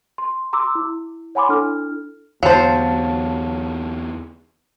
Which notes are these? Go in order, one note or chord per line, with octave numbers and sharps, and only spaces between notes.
C6
A#5 C6 D6 E6
E4
C#5 F#5 G#5 B5 C6 D6
D4 E4 A4 F6
E2 D3 F#3 B3 C5 F5 A5